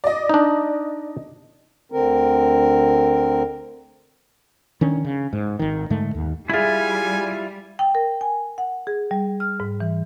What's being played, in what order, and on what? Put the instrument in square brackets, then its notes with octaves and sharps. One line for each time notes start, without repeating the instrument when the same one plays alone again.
[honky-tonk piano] D5 D#5
[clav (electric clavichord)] D4 D#4
[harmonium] D2 D3 C4 A#4
[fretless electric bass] D#3 C#4 D4
C#3
G#2
G#1 D#3
G#2 D3 G#3 A3
D#2
[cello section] G3 [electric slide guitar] E4 F4 [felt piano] G#4 E5 [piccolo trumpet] G#5
[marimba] G5
A#4
G#5
F#5
G#4
G3
F6
G#2
E3